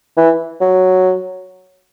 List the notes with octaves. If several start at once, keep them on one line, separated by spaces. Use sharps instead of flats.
E3
F#3